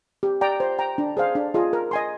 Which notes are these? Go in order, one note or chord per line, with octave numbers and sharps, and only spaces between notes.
G4
D5 G5 A#5
C5
G5 A#5
D4
G#4 C5 F5
D4
F4 G#4 D#5
A#4
D#5 G#5 C6